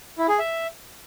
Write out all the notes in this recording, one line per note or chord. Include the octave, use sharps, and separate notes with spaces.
E4
G#4
E5